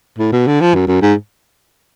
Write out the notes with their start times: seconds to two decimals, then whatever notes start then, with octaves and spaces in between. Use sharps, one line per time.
0.18 A2
0.32 B2
0.47 D3
0.61 F3
0.75 F#2
0.87 F#2
1.02 G#2